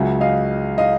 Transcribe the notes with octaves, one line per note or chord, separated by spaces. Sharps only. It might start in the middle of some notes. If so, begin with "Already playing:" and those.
Already playing: C#2 C#3 F#3 E5 F#5
D#5 F5
D#5 F5